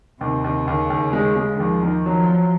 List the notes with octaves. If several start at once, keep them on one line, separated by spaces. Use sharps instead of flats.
D#2 C3
D#2
D#2 C#3
D#2
G#3
G#3
D#2 F3
D#3
F3 F#3
F#3